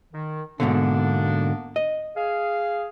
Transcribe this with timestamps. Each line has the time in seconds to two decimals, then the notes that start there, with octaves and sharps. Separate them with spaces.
0.13 D#3
0.60 G#2 B2 D3 A#3 B3 D4
1.76 D#5
2.17 G#4 F5